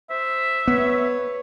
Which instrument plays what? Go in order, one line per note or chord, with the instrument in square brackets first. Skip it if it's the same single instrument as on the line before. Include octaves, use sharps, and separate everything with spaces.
[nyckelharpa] C5 [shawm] E5
[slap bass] B3 [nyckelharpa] B4 C#5